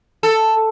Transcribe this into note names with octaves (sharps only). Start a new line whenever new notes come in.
A4